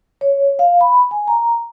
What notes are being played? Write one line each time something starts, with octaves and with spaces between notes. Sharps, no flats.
C#5
F5
B5
G#5
A#5